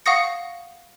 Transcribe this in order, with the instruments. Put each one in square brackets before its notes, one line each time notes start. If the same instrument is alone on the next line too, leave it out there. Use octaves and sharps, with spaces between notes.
[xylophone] F5 F#5 C#6 D#6 A#6 C#7